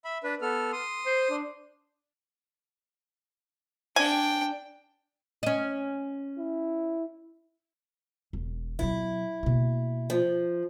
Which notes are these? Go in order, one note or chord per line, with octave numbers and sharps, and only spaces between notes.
E5 B5
D4 B4
B3 A4 F6
C6 D#6
C5
D4
D4 G5 G#5
C#4 D#5
E4
E1
B2 F#3 E4
B2 A#3
F3